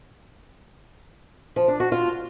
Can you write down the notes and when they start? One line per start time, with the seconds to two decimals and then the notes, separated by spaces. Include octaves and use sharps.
1.56 F3
1.68 D4
1.80 F#4
1.92 F4